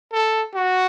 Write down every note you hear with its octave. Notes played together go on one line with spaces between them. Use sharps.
A4
F#4